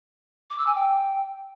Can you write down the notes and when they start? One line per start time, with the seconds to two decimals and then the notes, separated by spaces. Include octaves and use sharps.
0.50 D6
0.58 E6
0.67 G#5
0.75 G5